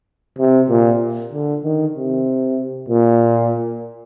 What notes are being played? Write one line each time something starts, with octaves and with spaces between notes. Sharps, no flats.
C3
A#2
D3
D#3
C3
A#2